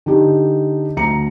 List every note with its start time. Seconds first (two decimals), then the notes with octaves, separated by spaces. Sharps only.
0.06 D3 D#4 G4
0.97 D2 A#5 C#7